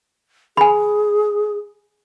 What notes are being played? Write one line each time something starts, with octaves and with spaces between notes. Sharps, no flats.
G#4 G#5 B5